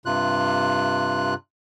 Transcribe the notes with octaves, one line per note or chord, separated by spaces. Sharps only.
G2 C3 F4 F#6